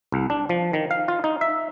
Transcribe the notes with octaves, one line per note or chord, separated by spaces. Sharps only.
C2
D4
F3
D#3
F5
F4
D#4
E5